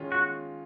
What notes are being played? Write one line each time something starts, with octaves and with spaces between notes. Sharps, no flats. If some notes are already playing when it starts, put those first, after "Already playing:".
Already playing: D#3 G#3 C#4 F4
F#4